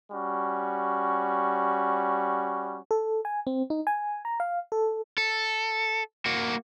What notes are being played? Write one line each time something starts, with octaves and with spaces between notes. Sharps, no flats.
G3 C#4 F#4
A4
G#5
C4
D#4
G#5
A#5
F5
A4
A4
A#3 F#4